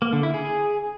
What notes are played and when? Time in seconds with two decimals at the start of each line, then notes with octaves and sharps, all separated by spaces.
0.02 A#3
0.13 D3
0.23 E4
0.34 G#4